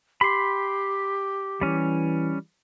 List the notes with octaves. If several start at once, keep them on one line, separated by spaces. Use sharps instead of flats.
G4 B5 C6
E3 G3 C#4